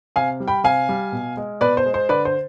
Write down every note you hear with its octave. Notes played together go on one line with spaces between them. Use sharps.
C3 F5 G#5
G3
G5 B5
C3 F5 G#5
G3
B2
G#3
B2 B4 D5
C5
G#3
C5
D3 B4 D5
C5